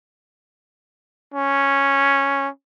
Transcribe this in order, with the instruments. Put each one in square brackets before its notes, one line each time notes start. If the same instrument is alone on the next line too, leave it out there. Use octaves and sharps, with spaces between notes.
[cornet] C#4